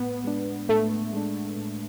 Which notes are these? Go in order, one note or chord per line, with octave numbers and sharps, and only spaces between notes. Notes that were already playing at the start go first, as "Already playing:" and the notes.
Already playing: A2 B3
G#3 D4
A2 A3
G#3 D4
A2